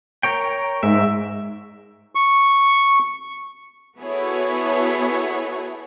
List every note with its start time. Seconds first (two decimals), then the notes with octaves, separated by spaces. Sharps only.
0.23 A#4 C#5 G5
0.83 G#2 E5
2.15 C#6
3.99 B3 E4 F#4 G#4 A4 C#5